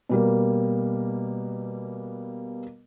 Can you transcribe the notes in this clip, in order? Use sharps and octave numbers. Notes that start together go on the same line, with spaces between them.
B2 G3 A#3